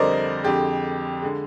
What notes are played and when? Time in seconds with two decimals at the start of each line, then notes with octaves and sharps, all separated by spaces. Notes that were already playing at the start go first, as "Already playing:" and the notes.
Already playing: F2 D3 G3 A#4 C5 D5 D#5
0.44 F2 D3 G#3 G4
1.22 D3 G#3